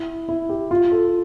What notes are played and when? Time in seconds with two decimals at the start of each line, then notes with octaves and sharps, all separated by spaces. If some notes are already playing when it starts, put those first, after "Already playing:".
Already playing: E4
0.29 E4
0.49 G4
0.71 F4
0.92 A4